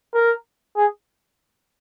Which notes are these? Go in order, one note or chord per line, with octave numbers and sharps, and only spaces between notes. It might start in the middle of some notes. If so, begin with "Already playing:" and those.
A#4
G#4